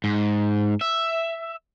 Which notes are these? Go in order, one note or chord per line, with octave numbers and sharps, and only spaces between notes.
G#2
E5